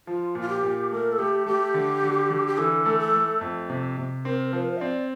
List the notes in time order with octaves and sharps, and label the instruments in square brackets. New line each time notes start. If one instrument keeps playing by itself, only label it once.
[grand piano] F3 [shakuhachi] F4
[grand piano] A#2
[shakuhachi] F4
G4
[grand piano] A#2
[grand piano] A3 [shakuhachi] A#4
[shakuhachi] A4
[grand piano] A3 [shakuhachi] G4
[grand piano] A3 [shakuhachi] G4
[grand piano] D3
D3
D3
[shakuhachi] G4
[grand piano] E3 [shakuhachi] A4
[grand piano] A3
[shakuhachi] A4
[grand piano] A3
F2
C3
C3
[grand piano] C4 [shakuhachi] A#4
[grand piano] F3 [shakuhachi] C5
[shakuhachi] A#4
C5
E5
[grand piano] C4 [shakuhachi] D5